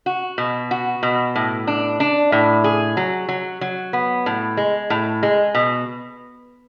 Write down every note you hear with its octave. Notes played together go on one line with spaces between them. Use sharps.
F#4
B2
F#4
B2
A2
D4
D4
A2
G#4
F#3
F#3
F#3
B3
A2
G#3
A2
G#3
B2